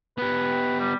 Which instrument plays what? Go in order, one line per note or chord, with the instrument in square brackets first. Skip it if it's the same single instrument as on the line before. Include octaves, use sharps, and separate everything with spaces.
[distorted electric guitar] B3 G4 [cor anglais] B4
[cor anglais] G3